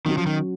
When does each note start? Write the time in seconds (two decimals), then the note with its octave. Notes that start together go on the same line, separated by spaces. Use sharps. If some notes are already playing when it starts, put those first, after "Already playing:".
0.06 D#3 F#3 C#4 F#4
0.18 F3
0.26 D#3